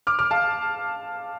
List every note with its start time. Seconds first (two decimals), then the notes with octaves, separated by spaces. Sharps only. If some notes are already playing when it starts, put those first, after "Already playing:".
0.07 D6 F6
0.19 D6 F6
0.31 F5 A5